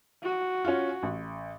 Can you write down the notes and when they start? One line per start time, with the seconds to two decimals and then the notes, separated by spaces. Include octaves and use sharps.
0.23 F#4
0.65 C#4 F4
1.03 A1